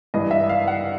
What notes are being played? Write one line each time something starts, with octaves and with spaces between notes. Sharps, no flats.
G2 E3 D#5
E5
F5
F#5